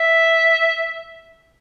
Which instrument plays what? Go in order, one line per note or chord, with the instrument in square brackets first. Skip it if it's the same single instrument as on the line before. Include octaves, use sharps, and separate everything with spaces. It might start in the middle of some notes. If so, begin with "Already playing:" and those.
Already playing: [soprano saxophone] E5